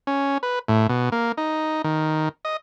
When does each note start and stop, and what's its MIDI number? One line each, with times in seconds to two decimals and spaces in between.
0.07 0.38 61
0.43 0.59 71
0.68 0.87 45
0.89 1.10 47
1.12 1.32 58
1.37 1.82 63
1.84 2.29 51
2.45 2.57 75